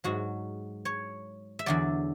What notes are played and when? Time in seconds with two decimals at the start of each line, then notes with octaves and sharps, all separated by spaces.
0.04 G#2 F#3 F#4
0.85 C#5
1.59 E5
1.66 E2 D3 F#3 D5